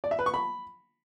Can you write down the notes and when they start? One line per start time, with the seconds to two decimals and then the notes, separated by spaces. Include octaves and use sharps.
0.04 D5
0.11 E5
0.19 B4
0.26 C#6
0.34 B5